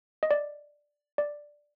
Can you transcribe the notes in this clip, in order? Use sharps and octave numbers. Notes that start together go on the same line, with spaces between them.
D#5
D5
D5